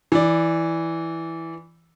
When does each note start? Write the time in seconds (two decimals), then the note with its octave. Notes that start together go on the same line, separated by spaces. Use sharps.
0.12 E3 D5